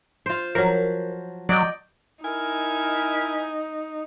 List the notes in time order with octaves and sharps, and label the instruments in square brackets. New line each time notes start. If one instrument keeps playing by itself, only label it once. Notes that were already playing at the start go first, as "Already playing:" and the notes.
[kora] F4 C5
[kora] F3 F#3 [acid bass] A#4
[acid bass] F#3 [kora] D5 D#5 G5
[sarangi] D#4 [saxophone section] E4 A#4 [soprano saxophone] G#5